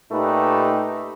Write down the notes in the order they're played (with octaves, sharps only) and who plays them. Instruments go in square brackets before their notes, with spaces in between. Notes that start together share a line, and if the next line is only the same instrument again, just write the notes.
[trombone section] A#2 A3 D#4 G4 B4